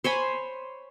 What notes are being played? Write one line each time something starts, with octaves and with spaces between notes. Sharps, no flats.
C5 C#5 G#5 B5